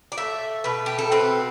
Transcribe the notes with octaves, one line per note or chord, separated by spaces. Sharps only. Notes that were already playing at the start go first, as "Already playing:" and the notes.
D5
A3 E5
B2 B4
G4
A4
C4 B4